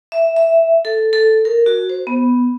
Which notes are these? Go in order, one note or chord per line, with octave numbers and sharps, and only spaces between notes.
E5
E5
A4
A4
A#4
F#4
C5
B3